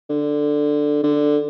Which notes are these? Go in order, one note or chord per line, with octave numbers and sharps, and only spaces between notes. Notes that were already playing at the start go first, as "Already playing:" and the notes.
D3
D3